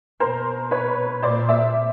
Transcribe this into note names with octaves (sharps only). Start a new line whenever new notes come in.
B2 A#4 C5
B4 C#5
A#2 C5 D5
D5 E5